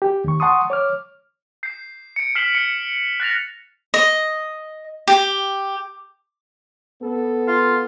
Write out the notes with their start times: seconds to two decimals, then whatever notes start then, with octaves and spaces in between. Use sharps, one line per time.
0.02 G4
0.24 D#2 C#6
0.40 F#5 A5 C6 C#6 D#6
0.70 C#5 D6 F6
1.63 G6 C7
2.16 C#7 D7
2.35 F6 B6 C7 E7 F#7
2.55 C#7
3.20 F#6 A6 A#6 F7
3.94 D#5
5.08 G4
7.02 B3 A4
7.48 F4